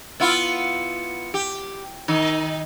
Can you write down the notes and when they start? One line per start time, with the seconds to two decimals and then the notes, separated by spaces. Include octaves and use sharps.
0.20 B3 E4 F4
1.34 G4
2.08 D#3 D#4